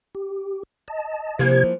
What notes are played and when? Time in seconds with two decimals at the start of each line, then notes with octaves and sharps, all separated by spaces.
0.15 G4
0.88 D#5 A5
1.39 C3 E3 F3 A#3 G4 G#6